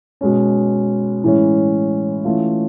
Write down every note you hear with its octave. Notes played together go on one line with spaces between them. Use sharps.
B2 G#3 C#4
A2 E3 G#3 C#4
E3 A3 C#4 F4